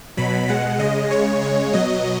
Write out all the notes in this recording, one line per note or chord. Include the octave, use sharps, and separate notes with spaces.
B2 F#3 B5
B2 G#3 F#5
C#3 G#3 D#5
C#3 G#3 C#5
C#3 G#3 C#5
B2 F#3 D#5